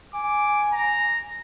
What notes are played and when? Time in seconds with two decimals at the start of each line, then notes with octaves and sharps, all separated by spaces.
0.14 G#5 D6
0.73 A#5